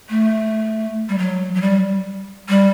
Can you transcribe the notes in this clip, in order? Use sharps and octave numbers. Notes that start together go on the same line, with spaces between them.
A3
G3
F#3
F#3
G3
G3